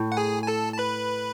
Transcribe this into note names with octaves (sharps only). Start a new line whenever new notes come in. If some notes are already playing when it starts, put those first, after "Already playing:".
Already playing: A2
F#5
G#4 G#5
G#5
A4 A5
A5
B4 B5